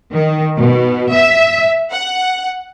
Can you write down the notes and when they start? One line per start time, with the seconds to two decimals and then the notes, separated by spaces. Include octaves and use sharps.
0.13 D#3
0.58 B2
1.13 E5
1.92 F#5